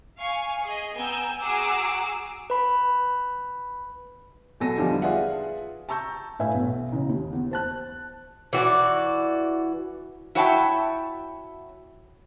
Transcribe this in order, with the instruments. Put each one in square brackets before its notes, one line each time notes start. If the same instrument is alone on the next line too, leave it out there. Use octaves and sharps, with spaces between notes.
[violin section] F5 G#5 C#6
G#4 D#5
B3 G5 G#5 A#5 E6 G6
F#4 G#4 F#5 A#5 D6 E6
[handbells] B4 B5
[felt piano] E2 B2 F#3 A4 A#6 D#7
E2 D3 F3 G3 D#4
F4 G#4 B4 D5 E5 F#5
A5 A#5 C#6 E6 G6
A2 B4 E5 F5 G#5
B1
C#3 E3 D#4
D#2
E2
C5 A5 F#6
[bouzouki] E3 F#4 D5
[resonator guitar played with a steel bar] E4 F#4 C#5 E5 G5 A5